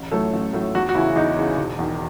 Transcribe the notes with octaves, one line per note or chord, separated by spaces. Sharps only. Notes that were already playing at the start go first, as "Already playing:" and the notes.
Already playing: A1
A2 F#3 A3 A4
A1
A2 F#3 A3
E2 F#4
F#4
C#3 E3 E4
E2 D#4
C#3 E3
E1
E2 D#3